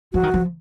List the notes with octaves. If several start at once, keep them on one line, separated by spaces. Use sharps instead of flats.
F3 F#4
D#3
F3